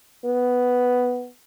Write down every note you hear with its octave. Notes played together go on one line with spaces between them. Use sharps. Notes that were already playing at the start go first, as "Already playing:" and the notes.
B3